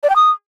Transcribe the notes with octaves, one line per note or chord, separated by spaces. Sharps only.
D5
G5
D#6